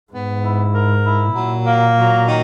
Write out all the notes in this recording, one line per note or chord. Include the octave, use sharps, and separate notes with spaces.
G#2 B3
E4
A#4
E4
A#2 F#3
A#3
F#3
D#3